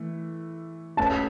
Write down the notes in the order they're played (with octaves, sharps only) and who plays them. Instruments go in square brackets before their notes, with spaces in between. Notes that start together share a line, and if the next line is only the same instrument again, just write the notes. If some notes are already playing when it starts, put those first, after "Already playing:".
Already playing: [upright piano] E3 A3
[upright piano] A3 C#4 F#4 B4 [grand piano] A5